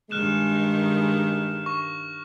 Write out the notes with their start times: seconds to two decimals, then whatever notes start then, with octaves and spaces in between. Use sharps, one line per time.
0.11 G2 D#3 G#3 F6 F#6 E7
1.66 C#6